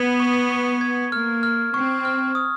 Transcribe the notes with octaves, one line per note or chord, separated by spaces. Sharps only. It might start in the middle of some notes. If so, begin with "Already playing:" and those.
Already playing: B3 G#6
C#6
C#6
G#6
A#3 F6
F6
C4 C#6
F6
D#6